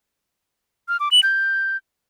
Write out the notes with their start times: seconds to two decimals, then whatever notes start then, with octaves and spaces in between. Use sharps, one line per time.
0.89 F6
1.00 D6
1.12 F#7
1.23 G6